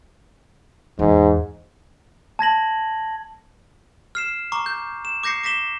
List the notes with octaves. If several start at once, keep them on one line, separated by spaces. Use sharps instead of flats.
E2 G#2
A5 G#6 A#6 F#7
F6 C7 E7
A#5 C#6 D6
G6
E7
D6 G6 A#6 C7 C#7
D6 A#6 B6 E7 G7